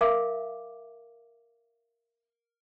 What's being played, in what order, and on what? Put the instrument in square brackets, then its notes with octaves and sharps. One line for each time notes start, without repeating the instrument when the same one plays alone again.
[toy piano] A#4 E5 F5 D6